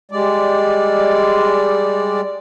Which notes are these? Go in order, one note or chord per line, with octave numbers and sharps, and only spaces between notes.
G3 G#3 D5